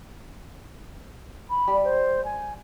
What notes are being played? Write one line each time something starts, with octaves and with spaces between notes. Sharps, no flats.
B5
G3
C5
G#5